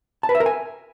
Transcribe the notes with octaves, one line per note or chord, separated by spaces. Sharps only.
A5
B4
E5
A#4
G#5